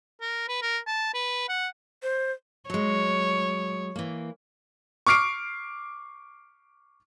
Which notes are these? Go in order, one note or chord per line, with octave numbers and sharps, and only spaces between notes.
A#4
B4
A#4
A5
B4
F#5
C5
F#3 G#3 C#5
E3 A#3
C#6 D6 F6 C7 D7